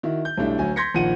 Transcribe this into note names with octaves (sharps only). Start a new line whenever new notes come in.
D#3 E4 F#4
G6
B1 G3 A3 D4 E4
D2 F#3 G#5
C6 G6 G#6 A#6 B6 C#7
A#1 A#2 D#3 F3 F#5 D#7